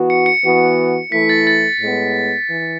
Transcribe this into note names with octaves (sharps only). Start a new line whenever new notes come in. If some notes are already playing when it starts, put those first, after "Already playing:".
Already playing: E3 B3 F#4
C#7
C#7
E3 B3 F#4
E3 A3 E4 B6
A6
A6
A2 G#3 B3
E3